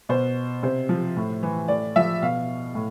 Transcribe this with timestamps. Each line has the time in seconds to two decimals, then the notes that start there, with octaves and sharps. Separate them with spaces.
0.09 B2 C5
0.63 C3 C5
0.89 F3
1.16 A2
1.43 E3
1.68 A2 D5
1.96 F3 E5
2.22 B2 F5
2.75 A2